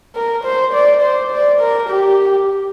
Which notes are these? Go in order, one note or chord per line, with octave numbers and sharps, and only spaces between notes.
A#4
C5
D5
C5
D5
A#4
G4